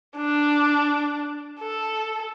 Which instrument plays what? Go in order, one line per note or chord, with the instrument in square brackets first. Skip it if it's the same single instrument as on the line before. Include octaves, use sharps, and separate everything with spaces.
[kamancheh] D4
A4